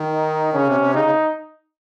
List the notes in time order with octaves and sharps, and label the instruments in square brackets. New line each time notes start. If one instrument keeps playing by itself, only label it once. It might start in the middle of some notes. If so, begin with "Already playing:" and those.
Already playing: [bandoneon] D#3
[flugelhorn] D#4
[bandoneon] C#3 [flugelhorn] C#4
[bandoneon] C3
C3
[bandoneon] C#3 [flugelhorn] D#4
[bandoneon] C#3